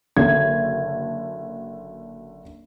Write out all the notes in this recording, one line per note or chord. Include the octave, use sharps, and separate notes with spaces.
F#1 D3 G#6